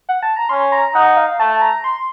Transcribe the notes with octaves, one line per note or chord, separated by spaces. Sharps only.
F#5
A5
A#5
C#4 C6
A#5
D#4 F#5
F5
A3 A5
A#5
C6